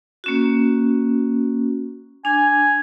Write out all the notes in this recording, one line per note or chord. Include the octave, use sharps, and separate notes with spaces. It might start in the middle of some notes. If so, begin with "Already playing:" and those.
A#3 C#4 F#4
D4 G#5